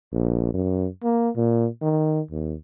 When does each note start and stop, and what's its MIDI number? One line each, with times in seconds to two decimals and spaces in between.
0.12 0.52 34
0.54 0.87 42
1.04 1.29 58
1.36 1.67 46
1.82 2.20 51
2.31 2.54 39